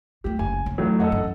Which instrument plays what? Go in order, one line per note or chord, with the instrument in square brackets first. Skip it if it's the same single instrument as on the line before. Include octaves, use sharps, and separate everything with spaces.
[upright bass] F3 A3 [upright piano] G4
[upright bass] F#1 [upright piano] G#5
[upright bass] C#4
[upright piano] A2 F#3
[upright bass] F2 [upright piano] A4 D#5 F#5
[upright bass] F#2 E3